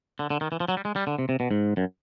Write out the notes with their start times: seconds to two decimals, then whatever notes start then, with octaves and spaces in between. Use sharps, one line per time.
0.19 D3
0.30 D3
0.41 D#3
0.52 E3
0.60 F3
0.68 F#3
0.77 G3
0.85 G#3
0.96 G3
1.07 D3
1.19 C3
1.29 C3
1.40 B2
1.51 G#2
1.77 F#2